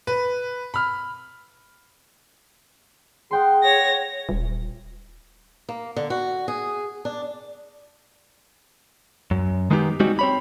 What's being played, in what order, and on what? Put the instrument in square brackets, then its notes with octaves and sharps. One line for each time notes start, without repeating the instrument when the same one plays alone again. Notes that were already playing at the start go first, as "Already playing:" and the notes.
[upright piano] B4
B5 F6
[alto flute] G#4 [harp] F#5 G5 C6
[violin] C#5 A#6
[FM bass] D#1
[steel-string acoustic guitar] A#3
D3
F#4
G#4
D4
[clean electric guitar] F#2
D#3 G#3 B3 D#4 F4 G4
G3 G#3 C4 D#4 F#4
C4 C#5 B5